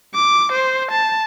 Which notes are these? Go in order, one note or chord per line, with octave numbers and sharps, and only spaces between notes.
D6
C5
A5